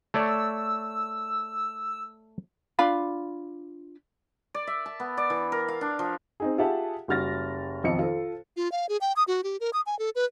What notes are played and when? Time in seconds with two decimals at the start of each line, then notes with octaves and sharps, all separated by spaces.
0.14 A3 C#5 D5 E6
2.79 D4 F4 F5 B5
4.54 D5
4.67 E5
4.86 A5
5.00 B3
5.17 D5
5.30 E3
5.52 A#4
5.68 F5
5.81 D4
5.99 F3
6.40 C4 D#4 G#4
6.58 F4 G4 G#4 E5 F#5 A5
7.08 F#1 G3 F#4 F6 A6 A#6
7.84 B1 F2 D#3 F3 D#5 C#7
7.99 F4 A4 C5
8.57 F4
8.72 F5
8.89 G#4
9.01 G5
9.16 D#6
9.28 F#4
9.44 G4
9.60 A#4
9.73 D#6
9.86 G#5
9.99 A4
10.15 B4